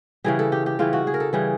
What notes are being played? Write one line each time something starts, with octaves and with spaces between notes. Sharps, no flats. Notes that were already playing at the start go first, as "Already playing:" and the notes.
C#3 E3 G3 G#4
A4
G4
G4
C#3 E3 G3 F4
F#4
G#4
A#4
A4
C#3 E3 G3 G#4